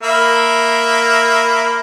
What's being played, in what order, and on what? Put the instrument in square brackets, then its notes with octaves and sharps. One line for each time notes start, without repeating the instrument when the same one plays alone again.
[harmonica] A#3 E5 B5